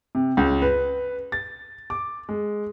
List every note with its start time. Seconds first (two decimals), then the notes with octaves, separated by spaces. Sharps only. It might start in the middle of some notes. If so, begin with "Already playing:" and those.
0.15 C3
0.37 C#2
0.62 B4
1.32 A6
1.90 D6
2.29 G#3